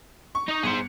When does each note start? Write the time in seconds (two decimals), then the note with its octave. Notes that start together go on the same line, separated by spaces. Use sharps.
0.35 C#6
0.48 D#4 D#5
0.63 G1 G#4 C5 C#7